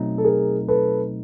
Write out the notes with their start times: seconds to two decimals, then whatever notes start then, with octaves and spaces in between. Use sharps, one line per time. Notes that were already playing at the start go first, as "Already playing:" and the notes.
Already playing: B2 F#3 A3 C4 D#4
0.18 A4
0.24 G#4 A#4
0.68 A4 B4